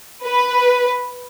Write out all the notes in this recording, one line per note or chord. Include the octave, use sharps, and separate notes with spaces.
B4